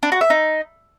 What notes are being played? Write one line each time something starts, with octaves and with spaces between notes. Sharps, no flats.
D4
F#4
E5
D#4